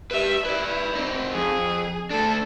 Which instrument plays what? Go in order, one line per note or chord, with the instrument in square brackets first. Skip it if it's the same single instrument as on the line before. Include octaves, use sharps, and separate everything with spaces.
[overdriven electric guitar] G4 B4 [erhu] E5
[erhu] E4 [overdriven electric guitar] B4 D5
[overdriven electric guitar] C4 D#4
[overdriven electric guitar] F2 [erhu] G#4
[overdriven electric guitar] A3 D4 [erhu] A4